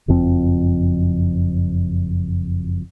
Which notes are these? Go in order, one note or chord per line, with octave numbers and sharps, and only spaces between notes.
F#1 F2 F3 C4